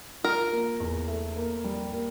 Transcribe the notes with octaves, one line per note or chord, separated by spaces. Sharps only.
F4 A#4
A#3
E2
A3
A#3
G3
A#3